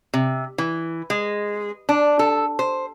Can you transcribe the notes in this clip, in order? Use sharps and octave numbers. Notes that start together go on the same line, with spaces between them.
C3
E3
G#3
D4
A4
C5